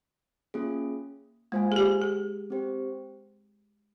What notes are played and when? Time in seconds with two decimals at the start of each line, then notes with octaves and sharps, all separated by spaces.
0.54 A#3 C#4 F4 G#4
1.52 G#3 A#3 F4 C5 F5 G#5
1.72 G#4
1.76 G4
2.02 G#4
2.50 C4 G4 C5